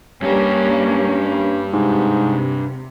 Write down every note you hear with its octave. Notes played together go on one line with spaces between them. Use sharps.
G2 G3 A#3 C#4 G4
G#2 C3